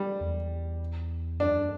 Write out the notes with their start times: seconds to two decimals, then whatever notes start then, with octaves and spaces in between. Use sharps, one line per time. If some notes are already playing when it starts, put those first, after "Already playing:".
Already playing: G3
0.21 E2
1.40 F#2 D4